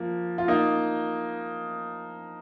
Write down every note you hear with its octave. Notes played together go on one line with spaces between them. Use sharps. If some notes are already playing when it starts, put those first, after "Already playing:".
Already playing: F3 A#3
F4
A#3 D#4